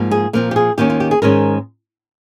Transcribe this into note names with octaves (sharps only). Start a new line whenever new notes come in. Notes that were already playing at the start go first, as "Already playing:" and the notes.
Already playing: G#2 F3 A#3
G#4
A#2 F3 C4 A#4
G4
G#4
D#2 D#3 A#3 C#4 G4
F4
G4
G#4
G#2 D#3 G#3 C#4 A#4